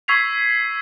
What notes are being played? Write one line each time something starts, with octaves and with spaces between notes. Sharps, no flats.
C#6 E6 G#6 B6 C7 F7